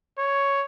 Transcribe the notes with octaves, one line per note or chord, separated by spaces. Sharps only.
C#5